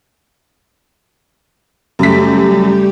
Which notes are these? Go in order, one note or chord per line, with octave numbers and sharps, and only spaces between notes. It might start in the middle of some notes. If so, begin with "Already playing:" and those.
F#2 C#3 G3 A3 G4 B6